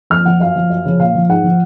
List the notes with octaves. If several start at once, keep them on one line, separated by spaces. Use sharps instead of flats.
F2 F6
F3 F#5
F#2 F5
F3
F#2
C#3 F3
A#2 F5
F3
G#2 F#5
F3